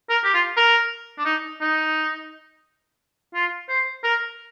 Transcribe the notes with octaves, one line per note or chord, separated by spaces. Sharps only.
A#4
G4
F4
A#4
D4
D#4
D#4
F4
C5
A#4